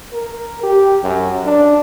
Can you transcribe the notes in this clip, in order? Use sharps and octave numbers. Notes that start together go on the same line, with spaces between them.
A#4
G4
F#2
D4